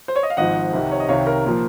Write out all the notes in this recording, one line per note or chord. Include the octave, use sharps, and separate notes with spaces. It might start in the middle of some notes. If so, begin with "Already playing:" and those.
C5
C#5
D#5
F5
G#1 G#2 F3 D#5 F#5
C2 C3 D#3
C#5
D#5
C2 C3 D#3 C#5 F5
A#4
A#2 F3